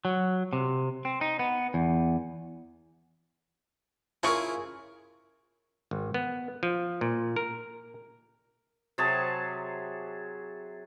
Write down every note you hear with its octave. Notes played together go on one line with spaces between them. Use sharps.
F#3
C3
C4
D#4
B3
E2
C#3 E4 F4 G#4 A#4 C#6
G#1
B3
F3
A#2
A#4
C3 F#3 G#4 A5